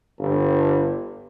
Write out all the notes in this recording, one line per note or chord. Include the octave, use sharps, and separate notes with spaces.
G1